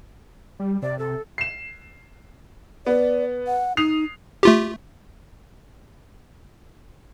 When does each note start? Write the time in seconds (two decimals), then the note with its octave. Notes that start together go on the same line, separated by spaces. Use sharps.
0.60 G3
0.82 C3 D5
0.99 C3 A4
1.38 C7 E7
2.87 B3 D5
3.47 F#5
3.77 D#4 D#6 C7 F7
4.43 A3 F4 G4